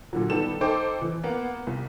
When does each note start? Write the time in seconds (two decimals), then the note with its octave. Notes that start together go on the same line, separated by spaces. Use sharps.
0.13 A#2 D3 F#3
0.30 D#3 G3 B3 A4 E7
0.61 D#4 A4 C5 G5 D6
1.02 E3
1.23 A#3 B3 F#5
1.67 C2